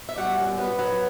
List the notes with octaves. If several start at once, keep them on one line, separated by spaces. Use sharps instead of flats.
E5
G3 F#4 F#5
F#2
F#2 B3 B4
F#3